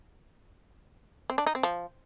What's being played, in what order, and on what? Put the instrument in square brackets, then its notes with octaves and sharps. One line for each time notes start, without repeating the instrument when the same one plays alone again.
[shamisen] C4
D4
D#4
C4
F3